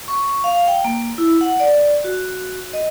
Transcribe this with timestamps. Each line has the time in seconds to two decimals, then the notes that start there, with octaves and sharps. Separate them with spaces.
0.08 C#6
0.44 F5
0.68 G5
0.84 A#3
1.18 E4
1.41 F#5
1.60 D5
2.04 F#4
2.73 D#5